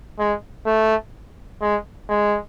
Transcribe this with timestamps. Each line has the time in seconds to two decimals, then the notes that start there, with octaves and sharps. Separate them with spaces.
0.19 G#3
0.66 A3
1.62 G#3
2.09 G#3